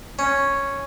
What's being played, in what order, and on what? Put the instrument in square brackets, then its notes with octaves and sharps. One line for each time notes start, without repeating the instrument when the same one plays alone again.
[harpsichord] C#4